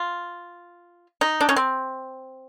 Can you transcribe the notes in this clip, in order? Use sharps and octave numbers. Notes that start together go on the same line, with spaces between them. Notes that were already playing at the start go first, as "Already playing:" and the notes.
Already playing: F4
D#4
D4
C#4
C4